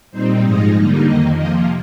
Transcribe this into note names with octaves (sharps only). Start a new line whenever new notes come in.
A#2 G3 C4 D#4 C5
G#2 F3 G#3 D#4 D#5
D3 G3 A#3 D#4
F2 D#3 A#3 D#5
C3 F3 A#3 D#5